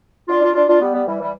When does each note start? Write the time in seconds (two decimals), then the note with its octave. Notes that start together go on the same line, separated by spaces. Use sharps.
0.28 D4 F4
0.41 D4 F4
0.54 D4 F4
0.67 D4 F4
0.80 G3 B3
0.93 G3 B3
1.06 E3 G3
1.20 E3 G3